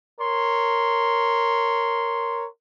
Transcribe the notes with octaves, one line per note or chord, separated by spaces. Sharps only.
A#4 C#5 C6